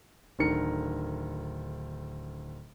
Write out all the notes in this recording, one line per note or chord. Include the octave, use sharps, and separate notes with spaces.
D1 D3 D#3 A#4 C#7